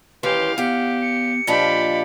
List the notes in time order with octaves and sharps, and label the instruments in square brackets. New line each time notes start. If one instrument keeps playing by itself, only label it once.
[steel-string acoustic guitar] D#2 E3 C#4 [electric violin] G4 F5 [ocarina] B4 [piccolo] C6
[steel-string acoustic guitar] E2 F5 [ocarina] B3 [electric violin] G4 [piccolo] F#5
[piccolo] C#7
[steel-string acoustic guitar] A#2 F3 D4 [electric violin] G4 B5 [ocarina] D#5